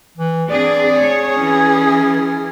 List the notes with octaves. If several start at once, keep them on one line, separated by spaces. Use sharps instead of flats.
E3
C4 D4 G#4 D5
G#4 C#5
E3 C#4